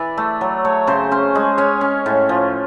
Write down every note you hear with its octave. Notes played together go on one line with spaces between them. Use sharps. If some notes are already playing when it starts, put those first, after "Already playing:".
Already playing: E3 D5 E5
A3
F#3
A3 C#5
C#3 C5
C#4 C5
G#3
C#4 C#5
C#4
A2
F3